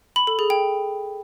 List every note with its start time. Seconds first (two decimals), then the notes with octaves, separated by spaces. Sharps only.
0.16 B5
0.27 A4
0.39 G#4
0.50 G5